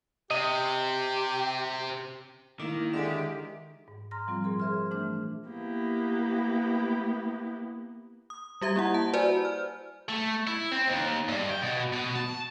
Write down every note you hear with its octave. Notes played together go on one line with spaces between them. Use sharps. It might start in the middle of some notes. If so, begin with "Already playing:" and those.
C3 G4 D#5
D#3 A#3 E4 D6
D3 G#3 G4 E5
G#2
A#5 C6 F6 A#6
F3 G3 C4 F4
A#2 G#4 A#4 C6
G#4 C5 E5 C6 F6
E3 A3 D4 F6
A#3 B3 E4 G4
D#6
G3 G4 E5 A#5 G#6
A#3 E4 F#5
A5
F#4 B4 C5 D5 G#5
F6
A3
E4
C4
D#2
G2
G5
B2
B2
A5